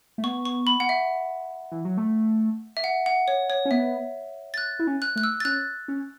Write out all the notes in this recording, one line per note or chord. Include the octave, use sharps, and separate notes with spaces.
A3
B3 C#6
C#6
B5
F#5
E5
E3
F#3
A3
E5
F#5
F#5
C#5
C#5
C#4
B3 E5
A6
F#6
E4
C#4
F#6
A3 F#6
E6
A6
C#4 F#6
C#4